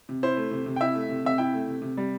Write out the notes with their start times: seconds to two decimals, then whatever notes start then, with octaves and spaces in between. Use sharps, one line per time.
0.09 C3
0.23 E4 C5
0.37 A3
0.51 C3
0.66 C3
0.76 G5
0.81 E4 E5
0.95 A3
1.09 C3
1.25 C3 E5
1.38 E4 G5
1.54 A3
1.68 C3
1.82 C3
1.97 G3